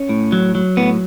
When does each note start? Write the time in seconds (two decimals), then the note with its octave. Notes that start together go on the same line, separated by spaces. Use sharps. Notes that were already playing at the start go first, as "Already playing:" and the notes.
Already playing: C#4
0.09 A2
0.32 F#3
0.55 F#3
0.77 A2 B3